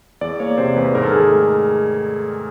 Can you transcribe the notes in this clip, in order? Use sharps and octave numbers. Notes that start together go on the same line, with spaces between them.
E2 D5
A#3 C#5
C3 C5
E2 B4
G#2 A#4
A4
D#3 G#4
A4
A3